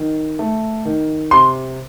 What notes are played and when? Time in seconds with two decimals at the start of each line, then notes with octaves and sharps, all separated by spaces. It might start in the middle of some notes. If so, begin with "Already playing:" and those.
Already playing: D#3
0.39 A3
0.85 D#3
1.31 C3 C6